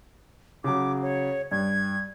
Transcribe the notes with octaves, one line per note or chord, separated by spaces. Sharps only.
C#3 F#3 D6
C#5
G2 G#6